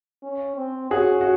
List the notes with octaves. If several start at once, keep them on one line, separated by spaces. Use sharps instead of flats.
C#4
C4
C#4 F#4 G#4
F#4